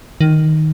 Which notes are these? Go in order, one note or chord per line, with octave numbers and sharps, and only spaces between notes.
D#3